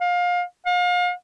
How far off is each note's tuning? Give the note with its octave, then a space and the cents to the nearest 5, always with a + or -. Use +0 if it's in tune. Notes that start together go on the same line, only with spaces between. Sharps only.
F5 +25
F5 +35